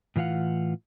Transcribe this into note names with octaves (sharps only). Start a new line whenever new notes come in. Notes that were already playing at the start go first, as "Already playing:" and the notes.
A2 E3 F4 F5 F#5